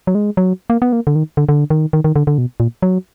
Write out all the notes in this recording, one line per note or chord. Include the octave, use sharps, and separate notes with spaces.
F#3
G#3
F#3
A#3
B3
A#3
D3
D#3
D3
D3
D#3
D#3
D#3
D3
D3
B2
A#2
F#3